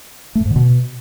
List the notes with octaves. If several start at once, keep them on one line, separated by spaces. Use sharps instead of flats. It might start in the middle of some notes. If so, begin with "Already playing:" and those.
A3
A2
G#2
D3
B2